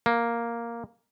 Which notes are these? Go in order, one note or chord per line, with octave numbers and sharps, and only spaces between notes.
A#3